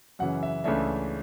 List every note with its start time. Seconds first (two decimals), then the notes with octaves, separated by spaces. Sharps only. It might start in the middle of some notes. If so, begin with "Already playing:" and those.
0.19 F#2 C#3 E3 F#5
0.43 E5
0.64 C#2 C#3 E3 A3 D4 E5